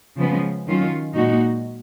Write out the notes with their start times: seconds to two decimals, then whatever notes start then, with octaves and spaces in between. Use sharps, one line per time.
0.17 C#3 F3 G#3 B3
0.67 D#3 F#3 C#4 F4
1.15 A#2 G#3 D#4 F#4